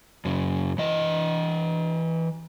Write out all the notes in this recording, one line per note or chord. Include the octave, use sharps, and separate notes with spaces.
F#2 C#3
E3 D#5